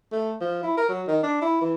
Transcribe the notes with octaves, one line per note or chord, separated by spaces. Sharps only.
A3
F3
E4
A#4
F#3
D#3
D4
E4
E3